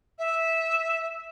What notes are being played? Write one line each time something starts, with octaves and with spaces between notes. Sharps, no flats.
E5